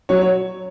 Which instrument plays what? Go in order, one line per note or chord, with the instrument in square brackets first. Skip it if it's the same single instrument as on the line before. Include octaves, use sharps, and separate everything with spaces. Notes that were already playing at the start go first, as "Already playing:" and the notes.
[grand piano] F#3 C#5
C#5